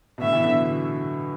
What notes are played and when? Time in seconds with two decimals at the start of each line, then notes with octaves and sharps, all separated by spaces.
0.18 B2
0.22 A2 D3 E5
0.33 B2 E3
0.43 D3 F#3